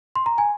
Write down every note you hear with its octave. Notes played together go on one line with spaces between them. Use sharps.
C6
A#5
G#5